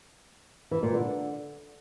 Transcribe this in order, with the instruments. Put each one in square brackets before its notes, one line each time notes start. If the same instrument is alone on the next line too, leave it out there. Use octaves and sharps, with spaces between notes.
[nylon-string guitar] E3
A#2
D3